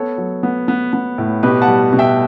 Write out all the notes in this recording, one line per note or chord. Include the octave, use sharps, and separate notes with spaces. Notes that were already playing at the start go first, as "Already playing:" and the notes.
Already playing: B3 A4 C#5
F#3
B3
B3
B3
A2
B2 G4 B4
F#5 A5
G3
B2
E5 G5